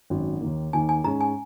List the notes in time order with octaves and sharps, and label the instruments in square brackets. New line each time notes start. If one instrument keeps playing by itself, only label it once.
[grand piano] G#1 F#2 F#3 C#4
D#2 D#3 A#3
[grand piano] D#2 D#3 A#3 [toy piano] G#5
[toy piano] G#5
[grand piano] G#2 G#3 C#4 [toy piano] A#5
[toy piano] G#5